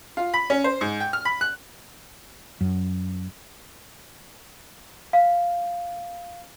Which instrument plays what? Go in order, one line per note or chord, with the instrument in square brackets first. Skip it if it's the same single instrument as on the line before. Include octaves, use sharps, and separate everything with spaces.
[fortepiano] F4
B5
C#4
C5
G#2
G5
F6
B5
F#6
[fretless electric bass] F#2
[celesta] F5